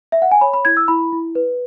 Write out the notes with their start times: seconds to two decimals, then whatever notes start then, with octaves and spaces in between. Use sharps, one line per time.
0.12 E5
0.22 F#5
0.32 G#5
0.41 C#5 B5
0.54 B5
0.65 E4 G#6
0.77 E6
0.88 E4 B5
1.12 E4
1.35 B4